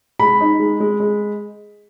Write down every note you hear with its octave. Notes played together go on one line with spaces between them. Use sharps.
G#3 B5
D#4
G#3
G#3
G#3